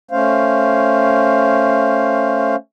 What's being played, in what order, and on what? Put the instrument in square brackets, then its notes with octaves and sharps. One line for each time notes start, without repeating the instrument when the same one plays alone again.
[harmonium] A3 C#4 C5 F5